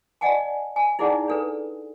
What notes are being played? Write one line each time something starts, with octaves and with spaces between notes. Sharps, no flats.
D5 D#5 F#5 G#5 A5
G#5
D#4 E4 G#4 D5 F#5
D4 A4 B4